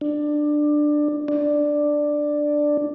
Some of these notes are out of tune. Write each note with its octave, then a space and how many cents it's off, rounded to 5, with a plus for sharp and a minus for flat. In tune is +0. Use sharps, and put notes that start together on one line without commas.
D4 +15
D4 +5